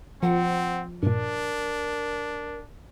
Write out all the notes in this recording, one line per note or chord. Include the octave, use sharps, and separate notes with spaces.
F3 C4 F#5
G2 A#2 D4 A#4